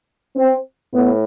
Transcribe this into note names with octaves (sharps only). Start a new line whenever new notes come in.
C4
A2 B3